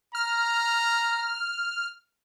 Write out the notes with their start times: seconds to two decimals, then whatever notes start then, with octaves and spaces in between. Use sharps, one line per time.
0.15 A#5 F6